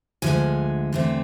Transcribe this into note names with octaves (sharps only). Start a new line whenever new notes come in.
D2 D3 F3 G#3 G#5
E2 D3 A3 C4